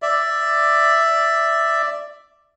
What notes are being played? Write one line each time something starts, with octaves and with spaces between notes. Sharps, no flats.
D5 E5